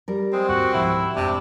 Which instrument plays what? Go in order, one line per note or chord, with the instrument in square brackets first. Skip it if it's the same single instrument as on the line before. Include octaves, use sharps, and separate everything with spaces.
[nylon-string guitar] G3 A#4
[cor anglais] G#3 [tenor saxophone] C4
[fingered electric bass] D#2 G#2 [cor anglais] F#4
[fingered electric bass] C#2 G#2 F3 [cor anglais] E4
[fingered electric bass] G#1 F2 G#2 [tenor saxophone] C3 [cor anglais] D4